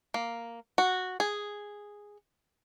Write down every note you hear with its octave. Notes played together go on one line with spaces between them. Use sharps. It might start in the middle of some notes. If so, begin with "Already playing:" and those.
A#3
F#4
G#4